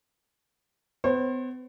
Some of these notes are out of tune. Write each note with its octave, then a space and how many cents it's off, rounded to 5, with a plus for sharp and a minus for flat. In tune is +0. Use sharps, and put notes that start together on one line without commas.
B3 +45 C5 +40